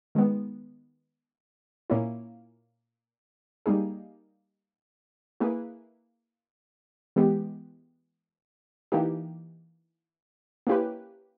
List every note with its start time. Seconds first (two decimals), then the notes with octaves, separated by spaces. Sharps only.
0.15 D#3 G#3 B3
1.90 A#2 A#3 C#4 E4
3.66 G3 A#3 D#4 G#4
5.40 A#3 E4 G#4 B4
7.16 E3 G#3 B3 G4
8.92 E3 A#3 D#4 G4
10.67 A#3 C#4 E4 G4 B4